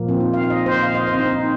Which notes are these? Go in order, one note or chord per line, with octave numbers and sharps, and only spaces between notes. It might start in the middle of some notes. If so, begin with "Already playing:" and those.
Already playing: A#2 F3 A#3
C4
D#4
F5
F5
D#5
C5
F5
D#5
C5
C4
D#4
D#4